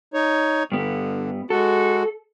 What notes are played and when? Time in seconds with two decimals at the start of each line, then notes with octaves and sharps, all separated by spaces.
0.14 D#4 C#5
0.72 G2 D3 B3
1.50 G#3 F#4 A4